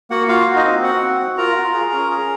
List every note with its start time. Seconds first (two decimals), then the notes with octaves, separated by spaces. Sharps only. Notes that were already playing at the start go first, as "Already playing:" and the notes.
0.10 A#3 F#4 F#5
0.28 F4 F#4 F5
0.47 F#4
0.56 D#4 D#5
0.65 C4
0.83 F#4 F#5
1.01 C4
1.19 F#4
1.38 F4 A#4 A#5
1.56 F4
1.74 G#4
1.92 C#4
2.11 G#4